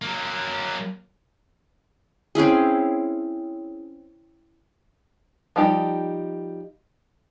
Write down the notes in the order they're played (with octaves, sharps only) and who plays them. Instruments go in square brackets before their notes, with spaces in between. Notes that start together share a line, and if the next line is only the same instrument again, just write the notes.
[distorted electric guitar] F#3 A#3
[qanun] C4 C#4 E4 G#4
[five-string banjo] F3 G3 D#4 G4